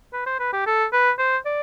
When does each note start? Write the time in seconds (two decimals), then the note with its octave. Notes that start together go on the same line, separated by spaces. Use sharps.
0.13 B4
0.26 C5
0.40 B4
0.53 G4
0.67 A4
0.93 B4
1.19 C5
1.45 D5